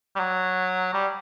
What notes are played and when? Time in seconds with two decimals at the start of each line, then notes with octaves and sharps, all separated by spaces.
0.15 G3
0.19 F#3
0.93 G3